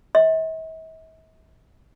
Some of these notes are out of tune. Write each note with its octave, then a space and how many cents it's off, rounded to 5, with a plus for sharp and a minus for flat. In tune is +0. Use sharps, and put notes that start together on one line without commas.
E5 -45 C6 +30